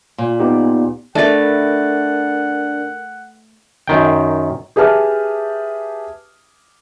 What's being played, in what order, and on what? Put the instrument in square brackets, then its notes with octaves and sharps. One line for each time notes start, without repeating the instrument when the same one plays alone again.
[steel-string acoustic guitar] A#2
[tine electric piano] B3 D#4 G4
[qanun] A3 B4 [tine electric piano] D4 A6 [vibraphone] A#4 [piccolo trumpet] F#5
[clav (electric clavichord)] F#2 D#3 G5
[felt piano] G4 G#4 B4 E5 A5 F6